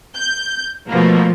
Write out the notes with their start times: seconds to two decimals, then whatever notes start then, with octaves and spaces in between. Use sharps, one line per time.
0.15 G6
0.90 B2 F3 A3 A#3